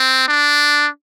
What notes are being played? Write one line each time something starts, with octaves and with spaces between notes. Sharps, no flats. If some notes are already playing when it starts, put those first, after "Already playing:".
Already playing: C4
D4